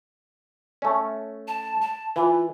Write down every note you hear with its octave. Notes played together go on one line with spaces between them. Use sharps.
A3 C#4
A5
A5
E3 F4